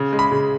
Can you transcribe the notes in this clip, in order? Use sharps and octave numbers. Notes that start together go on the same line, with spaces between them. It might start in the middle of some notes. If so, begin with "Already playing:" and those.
Already playing: C#3
G#3
B5
C#3